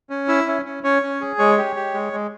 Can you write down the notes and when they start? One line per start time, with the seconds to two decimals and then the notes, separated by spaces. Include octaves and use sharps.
0.10 C#4
0.28 E4 E5
0.46 C#4
0.65 C#4
0.83 C#4 C#5
1.02 C#4
1.21 G#4
1.39 G#3 C#5
1.58 G4
1.76 G4
1.94 G#3
2.13 G#3